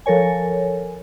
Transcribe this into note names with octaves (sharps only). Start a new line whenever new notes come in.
F3 A4 A#4 C#5 G#5